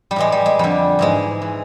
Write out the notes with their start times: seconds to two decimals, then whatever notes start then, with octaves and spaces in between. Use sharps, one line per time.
0.11 G3
0.16 A2 E3 G#3
0.32 G3
0.46 G#3
0.59 F2 D3 G3
0.99 G#2 E3 G#3
1.42 E3